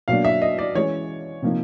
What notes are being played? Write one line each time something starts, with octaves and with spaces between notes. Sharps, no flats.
B2 F#3 A#3 D4 F5
E5
D#5
D5
E3 G#3 C#4 C#5
C3 F3 A#3 D#4